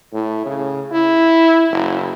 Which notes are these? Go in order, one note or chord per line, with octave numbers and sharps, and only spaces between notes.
A2
C#3
E4
F#1